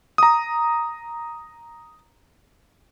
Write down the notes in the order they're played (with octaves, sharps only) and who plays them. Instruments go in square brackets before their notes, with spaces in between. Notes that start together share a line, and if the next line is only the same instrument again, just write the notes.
[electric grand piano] A#5 D#6